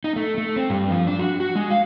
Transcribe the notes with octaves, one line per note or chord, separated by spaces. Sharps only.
D#4
A3
A3
C4
G2
F3
D4
F#4
F#4
G#3
F5